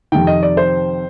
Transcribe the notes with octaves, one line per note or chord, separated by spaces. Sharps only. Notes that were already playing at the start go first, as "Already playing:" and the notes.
F2 C3 D#3 G5
D#5
D5
C5